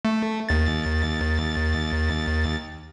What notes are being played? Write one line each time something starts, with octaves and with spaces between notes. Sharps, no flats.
A3
D#2 A6